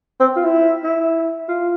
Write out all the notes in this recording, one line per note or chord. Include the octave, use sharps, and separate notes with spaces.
C4
F4
E4
E4
F4